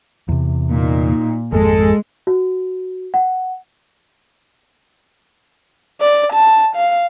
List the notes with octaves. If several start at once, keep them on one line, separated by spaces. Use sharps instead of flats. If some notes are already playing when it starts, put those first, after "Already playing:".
E2 C3
A#2 D#4
G#1 F2 G#3 G#4 A4
F#4
F#5
D5
A5
F5